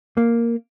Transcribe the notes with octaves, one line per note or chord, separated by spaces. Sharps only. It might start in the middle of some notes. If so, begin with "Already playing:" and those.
A#3